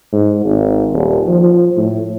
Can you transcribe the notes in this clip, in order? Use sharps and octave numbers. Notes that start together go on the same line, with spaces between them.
G#2
G#1
D#1
F3
A2